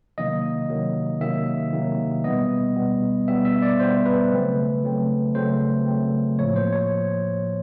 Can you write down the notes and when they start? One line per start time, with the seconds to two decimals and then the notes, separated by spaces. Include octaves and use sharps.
0.18 C3 D#3 F#3 A#3 D#5
0.69 C3 D#3 F#3 A#3
1.21 C3 D#3 F#3 A#3 E5
1.73 C3 D#3 F#3 A#3
2.24 B2 G3 B3 D#5
2.76 B2 G3 B3
3.28 B2 G3 B3 E5
3.45 E5
3.62 D5
3.80 B2 G3 B3 C5
4.05 B4
4.31 C#3 F#3 A3 C4
4.83 C#3 F#3 A3 C4
5.35 C#3 F#3 A3 C4 C5
5.86 C#3 F#3 A3 C4
6.39 A2 F3 A#3 C#5
6.56 C5
6.73 C#5